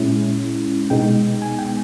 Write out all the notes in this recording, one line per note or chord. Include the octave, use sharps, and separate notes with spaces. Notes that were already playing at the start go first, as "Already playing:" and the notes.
Already playing: A#2 G#3 C#4 E4
B2 G#3 B3 D#4 G5
G#5
G5